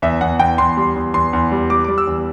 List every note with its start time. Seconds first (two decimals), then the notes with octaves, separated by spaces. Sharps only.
0.02 E2 E5
0.21 E2 F#5
0.40 E2 G5
0.58 E2 C6
0.77 G3
0.96 E2
1.14 E2 C6
1.33 E2
1.52 G3
1.70 G3 D6
1.84 G3 D6
1.98 E6
2.07 E2